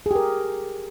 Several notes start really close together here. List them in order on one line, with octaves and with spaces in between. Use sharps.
G#4 G4 A#4